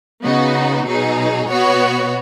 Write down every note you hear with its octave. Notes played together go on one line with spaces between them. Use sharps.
C#3 B3 D#4 F#4
B2 F#3 D#4 G#4
B2 B3 F#4 C#5